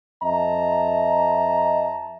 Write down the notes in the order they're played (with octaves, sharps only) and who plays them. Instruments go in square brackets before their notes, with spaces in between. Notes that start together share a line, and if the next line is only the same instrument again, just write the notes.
[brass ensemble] F2 D#5 E5 A5 A#5